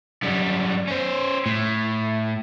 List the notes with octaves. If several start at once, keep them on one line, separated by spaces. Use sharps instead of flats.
F#2 G3
C#4 C5
A2